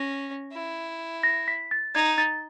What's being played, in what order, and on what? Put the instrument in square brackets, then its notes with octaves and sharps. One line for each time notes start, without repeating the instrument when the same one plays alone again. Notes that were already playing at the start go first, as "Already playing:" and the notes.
Already playing: [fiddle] C#4 [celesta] A#6
[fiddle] E4
[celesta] A#6
B6
A6
[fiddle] D#4 [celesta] G#6
[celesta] A6